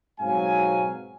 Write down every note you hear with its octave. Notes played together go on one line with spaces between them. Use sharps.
G#2 B2 F#3 C4 F5 G#5